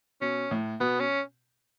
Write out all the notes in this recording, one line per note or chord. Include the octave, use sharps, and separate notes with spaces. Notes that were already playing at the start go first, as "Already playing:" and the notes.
B2 C#4
A2
B2 B3
C#4